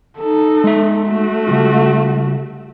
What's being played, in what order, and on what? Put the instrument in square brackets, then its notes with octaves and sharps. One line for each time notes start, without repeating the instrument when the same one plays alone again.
[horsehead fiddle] D#4 A4
[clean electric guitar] G#3 E5
[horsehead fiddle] A3 F#4
[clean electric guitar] C#3 G3 F4